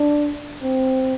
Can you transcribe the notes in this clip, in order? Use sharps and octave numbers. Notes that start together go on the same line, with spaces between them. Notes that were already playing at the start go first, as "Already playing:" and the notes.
Already playing: D4
C4